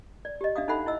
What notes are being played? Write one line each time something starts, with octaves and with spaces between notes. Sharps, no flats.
D5
G4 D#5
D4 E5 F5 D#6
D#4 A4 C5 E5 F#5 B5
E4 D#5 E6